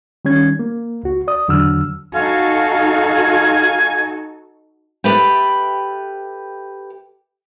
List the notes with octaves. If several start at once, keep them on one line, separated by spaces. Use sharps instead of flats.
D#3 G3 C#4 G#6
A#3
C#2 F#4
D5 D#6
E2 D3 F#3 E6 F6
D#4 F#4 A4 F5 G#5
G4 A4 B4 E5 G5